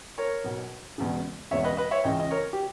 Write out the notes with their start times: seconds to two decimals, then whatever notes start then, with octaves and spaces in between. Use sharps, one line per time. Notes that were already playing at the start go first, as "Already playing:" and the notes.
0.18 A#4 C#5
0.44 B1 B2
0.98 E1 E2 C#3
1.51 E1 E2 C#3 C#5 E5
1.64 B4 D#5
1.77 B4 D#5
1.91 C#5 E5
2.04 C#2 C#3 E3 D#5 G5
2.20 D#5
2.31 A#4 C#5
2.53 G4